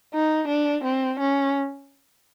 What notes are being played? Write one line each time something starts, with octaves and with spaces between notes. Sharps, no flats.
D#4
D4
C4
C#4